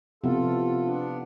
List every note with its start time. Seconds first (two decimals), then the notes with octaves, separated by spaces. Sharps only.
0.24 C3 F3 B3 E4 F4 A4
0.85 B3 D4